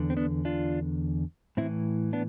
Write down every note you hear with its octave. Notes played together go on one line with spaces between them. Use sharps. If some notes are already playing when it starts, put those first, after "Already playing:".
Already playing: E2 D3
C4
B3 D4
D4 F4
A2 E3 C4 E4
B3 D4